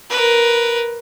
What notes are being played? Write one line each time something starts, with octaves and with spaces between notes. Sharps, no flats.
A#4 B4